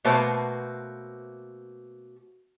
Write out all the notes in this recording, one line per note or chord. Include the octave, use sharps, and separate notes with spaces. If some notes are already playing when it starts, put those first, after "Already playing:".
B2 A3 A#3 F#4 B4 C5